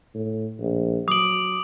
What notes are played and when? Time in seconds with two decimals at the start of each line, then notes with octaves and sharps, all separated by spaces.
0.15 A2
0.60 A#1
1.08 F#3 D6 D#6 D7 F#7